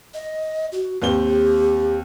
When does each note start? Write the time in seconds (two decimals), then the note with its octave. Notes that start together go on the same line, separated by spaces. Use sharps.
0.14 D#5
0.72 F#4
1.02 D#2 C4 G4 G7